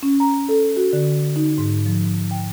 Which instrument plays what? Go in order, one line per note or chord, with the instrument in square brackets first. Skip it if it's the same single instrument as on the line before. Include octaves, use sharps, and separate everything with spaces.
[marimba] C#4
A#5
A4
F#4
D3
D#4
G#2
F3
G5